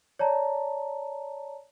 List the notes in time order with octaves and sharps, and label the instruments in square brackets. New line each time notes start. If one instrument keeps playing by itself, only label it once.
[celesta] C#5 D5 A5 A#5